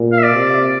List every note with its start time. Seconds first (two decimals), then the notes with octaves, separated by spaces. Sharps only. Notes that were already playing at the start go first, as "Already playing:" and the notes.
Already playing: A#2
0.12 F5
0.18 E5
0.23 D5
0.34 C3